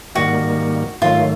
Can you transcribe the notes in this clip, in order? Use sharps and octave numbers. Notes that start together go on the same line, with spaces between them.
G#2 D#3 G3 A#3 F#4
G#2 D#3 F#3 A3 F4